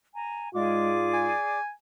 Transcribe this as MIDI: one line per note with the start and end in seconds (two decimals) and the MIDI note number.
0.14 0.49 80
0.14 0.49 82
0.55 1.32 44
0.55 0.91 56
0.55 1.32 65
0.55 1.59 68
0.55 1.59 74
0.55 1.59 86
1.14 1.71 80